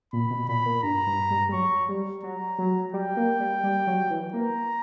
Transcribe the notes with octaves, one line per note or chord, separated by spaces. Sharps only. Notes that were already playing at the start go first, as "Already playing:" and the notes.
A#2 B5
B2
A#2 B5
A#2
G2 A#5
G2
G2
G3
F#3 C#6
G3
F#3 A#5
F#3
G3 G5
A#3
G3
G3
F#3
E3
A#3 A#5